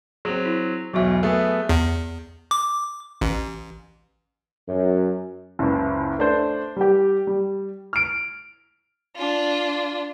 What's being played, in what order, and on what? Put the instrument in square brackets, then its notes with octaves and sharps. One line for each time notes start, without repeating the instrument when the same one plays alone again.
[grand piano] F#3 C4 [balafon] G#4
[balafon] E4
[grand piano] B1 E2 [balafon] F#3 F#4 E5
[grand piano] A3 B3 G#4
[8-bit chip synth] E2
D6
A1
[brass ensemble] F#2
[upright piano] F#1 C#2
A3 D4 C5
G3 G4
G3
F6 D7
[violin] D4 F4